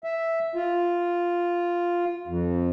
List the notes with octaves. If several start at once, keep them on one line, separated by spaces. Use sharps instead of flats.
E5
F4
F2